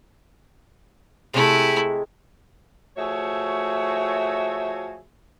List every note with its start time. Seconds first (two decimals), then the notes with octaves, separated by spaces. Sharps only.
1.34 C3 G#3 A3 E4
2.97 F3 A3 F#4 G#4 C#5 E5